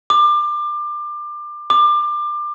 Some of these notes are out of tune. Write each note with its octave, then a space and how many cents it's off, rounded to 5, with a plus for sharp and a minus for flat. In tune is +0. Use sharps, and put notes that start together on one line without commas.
D6 +25
D6 +25